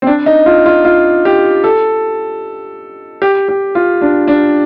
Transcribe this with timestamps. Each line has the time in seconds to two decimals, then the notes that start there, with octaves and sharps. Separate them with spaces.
0.02 C4
0.07 D4
0.26 D#4
0.46 F4
0.66 F4
0.85 F4
1.25 G4
1.64 A4
3.22 G4
3.48 G4
3.75 F4
4.01 D4
4.28 D4